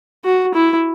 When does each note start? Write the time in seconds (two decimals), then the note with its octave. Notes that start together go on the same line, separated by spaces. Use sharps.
0.25 F#4
0.54 E4